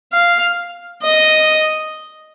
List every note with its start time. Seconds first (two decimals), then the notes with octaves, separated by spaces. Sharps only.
0.13 F5
1.03 D#5